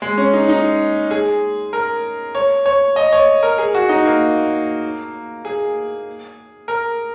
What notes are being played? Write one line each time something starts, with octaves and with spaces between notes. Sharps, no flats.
G#3
C#4
D#4
D#4
G#4
A#4
C#5
C#5
D#5
C#5
A#4
G#4
F#4
D#4
A#3
G#4
A#4